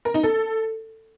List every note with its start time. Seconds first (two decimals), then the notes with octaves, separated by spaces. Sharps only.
0.05 A#4
0.14 D#4
0.23 A4